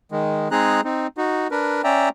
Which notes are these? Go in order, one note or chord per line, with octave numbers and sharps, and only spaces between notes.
D#3 G#3
G#3 C4 D#4 G#4 A#5 F#6
C4 D#4
D#4 F#4
D4 A#4 B4
C#4 D5 E5 G5 A#5